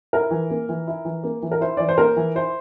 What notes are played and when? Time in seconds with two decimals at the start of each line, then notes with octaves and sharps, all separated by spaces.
0.13 E4 A#4
0.31 E3
0.50 A#3
0.69 E3
0.88 E4
1.05 E3
1.24 A#3
1.42 E3
1.52 A#4
1.61 E4 C5
1.77 E3 D5
1.89 C5
1.98 A#3 A#4
2.16 E3
2.35 E4 C5